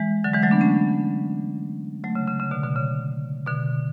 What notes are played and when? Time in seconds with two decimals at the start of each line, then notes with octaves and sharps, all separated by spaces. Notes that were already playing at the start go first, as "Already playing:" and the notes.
Already playing: E3 G#3
0.24 D3 F#3
0.33 E3 G#3
0.43 F#3 A3
0.51 B3 D4
0.61 A3 C#4
2.04 F#3 A3
2.15 C#3
2.28 C#3
2.40 C#3
2.51 B2 D3
2.64 B2 D3
2.76 C#3
3.47 B2 D3